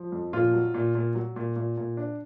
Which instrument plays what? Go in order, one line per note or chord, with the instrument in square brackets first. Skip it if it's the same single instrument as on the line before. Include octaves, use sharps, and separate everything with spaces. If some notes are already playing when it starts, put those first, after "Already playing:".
Already playing: [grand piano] F3
F2
[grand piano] A#2 [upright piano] F4
[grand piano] F#3
A#2
A#2
F#3
A#2
A#2
A#2
D4